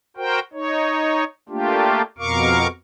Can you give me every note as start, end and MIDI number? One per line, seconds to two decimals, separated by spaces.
0.17 0.40 66
0.17 0.40 70
0.17 0.40 72
0.17 0.40 79
0.53 1.24 63
0.53 1.24 73
1.49 2.02 57
1.49 2.02 58
1.49 2.02 62
1.49 2.02 65
1.49 2.02 67
2.18 2.67 41
2.18 2.67 47
2.18 2.67 70
2.18 2.67 77
2.18 2.67 85
2.18 2.67 86